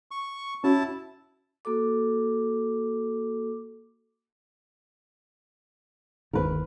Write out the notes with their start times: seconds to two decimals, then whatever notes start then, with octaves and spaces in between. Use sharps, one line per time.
0.11 C#6
0.64 C#4 E4 F#4 A5
1.65 A#3 F#4 A4 D6
6.33 G1 D#2 D#3 A#4 B4